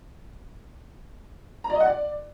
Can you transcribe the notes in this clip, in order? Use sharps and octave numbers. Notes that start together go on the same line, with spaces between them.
A#5
D5
D#5
F#5
D5